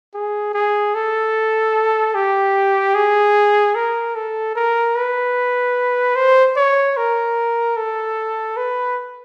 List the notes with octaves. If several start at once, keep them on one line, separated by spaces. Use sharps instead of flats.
G#4
G#4
A4
G4
G#4
A#4
A4
A#4
B4
C5
C#5
A#4
A4
B4